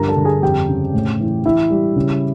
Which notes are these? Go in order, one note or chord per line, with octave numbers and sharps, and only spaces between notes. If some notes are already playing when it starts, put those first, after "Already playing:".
Already playing: G2 D3 F3 A#4 A#5
A4 A5
D3
G#4 G#5
F2 G4 G5
C#3
A2
E3
E3 E4 E5
G3
C#3